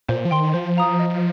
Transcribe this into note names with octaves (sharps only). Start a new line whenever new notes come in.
A#2 C5
F3
D#3 G5 C6
F3 C5
F5 A#5 D#6
D#5